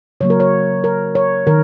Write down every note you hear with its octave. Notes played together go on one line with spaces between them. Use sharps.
C#3 F#3 A#3 C#5
A#4
C#5
A#4
C#5
D#3 A#4